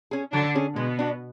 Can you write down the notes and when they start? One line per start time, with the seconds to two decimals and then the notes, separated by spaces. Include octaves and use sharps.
0.11 C#4 G#4
0.33 D3 F#3 D4
0.55 C#4 G#4
0.76 B2 G#3 B3
0.99 D4 F#4